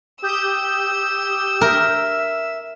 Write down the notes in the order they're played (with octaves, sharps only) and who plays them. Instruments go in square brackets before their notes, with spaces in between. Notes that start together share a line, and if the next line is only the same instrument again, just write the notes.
[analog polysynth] G4 D#6 G6 [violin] E6
[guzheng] A#4 [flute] E5